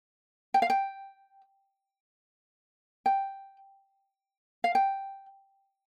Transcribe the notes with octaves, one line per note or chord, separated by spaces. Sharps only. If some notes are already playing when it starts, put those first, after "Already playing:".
G5
F5
G5
G5
F5
G5